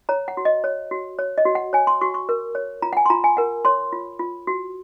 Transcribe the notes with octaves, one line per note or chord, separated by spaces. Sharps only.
C#5 A#5
F#5
F#4
D#5
C#5
F#4
C#5
D#5
F#4
F#5
C#5 G#5
C6
F#4 C#6
C#6
A#4
C#5
F4 A#5
F#5
G#5
C6
F4 A#5
G#5
A#4 F#5
C#5 C6
F4
F4
F#4